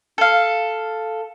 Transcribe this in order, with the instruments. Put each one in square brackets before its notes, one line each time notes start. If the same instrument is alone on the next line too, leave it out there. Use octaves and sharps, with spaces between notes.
[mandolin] A4 F5